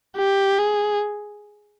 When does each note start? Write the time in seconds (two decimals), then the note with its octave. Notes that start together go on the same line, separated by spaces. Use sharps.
0.17 G4
0.58 G#4